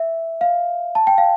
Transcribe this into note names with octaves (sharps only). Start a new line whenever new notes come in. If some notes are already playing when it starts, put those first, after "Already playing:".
Already playing: E5
F5
A5
G5
F5